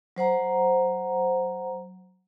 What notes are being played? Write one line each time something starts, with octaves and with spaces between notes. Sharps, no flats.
F#3 C5 F#5 A#5